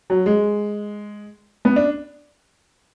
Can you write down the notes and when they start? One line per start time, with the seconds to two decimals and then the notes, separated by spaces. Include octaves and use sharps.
0.10 F#3
0.26 G#3
1.65 B3
1.76 D4